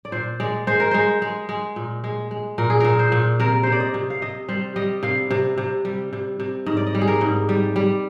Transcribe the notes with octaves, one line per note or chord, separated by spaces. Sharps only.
D5
A#2 C5
G#3 D5
G#3 C5
A#4
G#3 C5
G#3
G#3
A#2
G#3
G#3
A#2 A#4
G#4
A#2 A#4
C5
A#2
C3 A#4
C3 C5
D5
D#5
C3
F5
C3 D#5
G3 C5
G3 D#5
C3 F5
C3
C3
G3
C3
C3
G#2 D#5
D5
D#5
G3
G#4
A#4
G#2
G3
G3